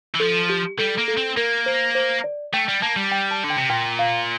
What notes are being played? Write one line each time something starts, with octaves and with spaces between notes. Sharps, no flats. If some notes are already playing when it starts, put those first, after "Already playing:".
E3
F3 A4
G4
G3 A4
A#3
A4
C4
A#3 A#4
C5
C5
D5
A3 G5
G3
A#3 A5
G3
G5
A5
D3
G5
C3
A#2 G5
F5